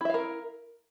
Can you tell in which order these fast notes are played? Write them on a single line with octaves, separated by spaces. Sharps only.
E4 E5 F5 A#4